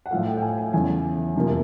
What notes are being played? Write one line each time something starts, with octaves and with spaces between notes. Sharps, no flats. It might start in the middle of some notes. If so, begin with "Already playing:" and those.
F#5
A2 F3 A3 F5
G5
G5
G#5
G#5
E2 C#3 E3 G#5
F2 C3 F3 A#3